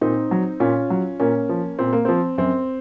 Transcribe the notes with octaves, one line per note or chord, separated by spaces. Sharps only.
A#2 C4 D#4
F#3
A#2 C#4 F4
F#3
A#2 A#3 C#4
F3
A#2 C4
A#3
F3 C4
F#2 C4